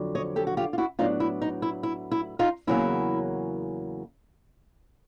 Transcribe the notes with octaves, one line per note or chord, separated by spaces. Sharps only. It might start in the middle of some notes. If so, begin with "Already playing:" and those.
Already playing: F2 D3 F#3
C#5 D#5
G4 A4
F#4
F4 G4
F4
E4 F#4
A2 F#3 B3 D4 D#4 F4
E4
D#4
E4
E4
E4
D#4 F4
E2 C#3 F#3 A#3 E4